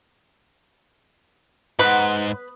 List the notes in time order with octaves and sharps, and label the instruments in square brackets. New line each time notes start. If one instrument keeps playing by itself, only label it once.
[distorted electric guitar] G#2 [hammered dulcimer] B3 [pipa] B4